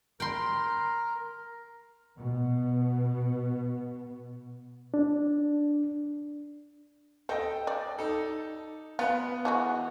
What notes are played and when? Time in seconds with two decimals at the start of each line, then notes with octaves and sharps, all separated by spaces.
0.20 A#4 G5 C6
2.17 B2 B3
4.94 D4
7.29 C4 A4 D#5 G5
7.67 D5
7.99 D#4 A4
8.99 B3 F4 B4
9.45 E3 G#3 F#4